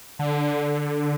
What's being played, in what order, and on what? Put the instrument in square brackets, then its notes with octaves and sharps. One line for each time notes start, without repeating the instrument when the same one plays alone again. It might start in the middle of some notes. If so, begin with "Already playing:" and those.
[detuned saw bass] D3